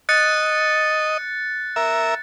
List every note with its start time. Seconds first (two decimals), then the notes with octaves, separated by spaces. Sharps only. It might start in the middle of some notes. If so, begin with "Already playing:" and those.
0.09 D#5 F#6 A6 C#7
1.76 A#4 E5